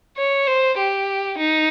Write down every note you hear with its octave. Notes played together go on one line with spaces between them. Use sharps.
C#5
C5
G4
D#4